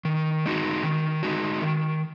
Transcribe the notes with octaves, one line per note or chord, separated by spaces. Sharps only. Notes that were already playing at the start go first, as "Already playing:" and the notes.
D#3
G#3 D#4 F#4
D#3
G#3 D#4 F#4
D#3